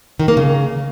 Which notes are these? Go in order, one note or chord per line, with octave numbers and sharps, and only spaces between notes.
D#3
A#3
C#3